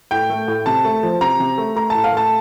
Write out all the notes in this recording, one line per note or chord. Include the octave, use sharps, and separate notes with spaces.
A2 G5
A3
A2
C3 A5
A3
F3
C3 A#5
C3
A3
A3 A#5
A2 A5
F5
A3 A5